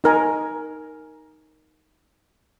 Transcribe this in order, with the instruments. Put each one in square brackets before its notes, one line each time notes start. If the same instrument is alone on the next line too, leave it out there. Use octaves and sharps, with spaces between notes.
[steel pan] D#4 A#4 G#5